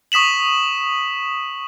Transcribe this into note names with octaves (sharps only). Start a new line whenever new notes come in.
C#6 D#6 B6 E7 F#7